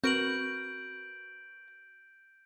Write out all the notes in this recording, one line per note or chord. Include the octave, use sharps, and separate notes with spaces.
C4 F#4 A#4 B4 G6 D7 F#7